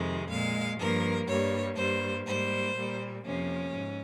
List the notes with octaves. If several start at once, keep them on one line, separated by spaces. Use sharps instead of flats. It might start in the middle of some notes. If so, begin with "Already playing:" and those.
Already playing: F2 C3 D#3 G#3
A#2 G#3 F5
G2 F3 A#3 A#4
G2 G3 A#3 C#5
G2 G3 A#3 C5
G#2 G3 A#3 C5
A#2 G3 A#3
F2 C3 F3 A#3 C#4
G#2